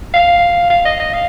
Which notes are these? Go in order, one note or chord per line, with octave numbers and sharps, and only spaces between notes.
F5
F5
D#5
D#5
F5